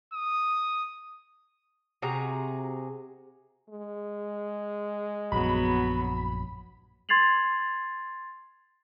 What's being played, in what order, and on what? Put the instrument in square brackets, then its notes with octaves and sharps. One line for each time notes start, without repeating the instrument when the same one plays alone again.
[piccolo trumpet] D#6
[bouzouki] C3 F#4 G#4 A#5
[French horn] G#3
[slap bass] A#1 F#2 [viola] F#3 B3 [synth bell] B5
[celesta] C6 G#6 A6 C7 F7 F#7